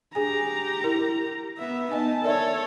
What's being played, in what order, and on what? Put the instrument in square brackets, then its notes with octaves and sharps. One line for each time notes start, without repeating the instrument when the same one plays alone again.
[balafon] D4 G#4 G#5 [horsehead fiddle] G4 A#5
[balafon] E4 A#4
[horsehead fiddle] B3 E5
[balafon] B3 D#5 G#5 [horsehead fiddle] D#4 A5
[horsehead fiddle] A4 C#5 [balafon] A#4 D5 E5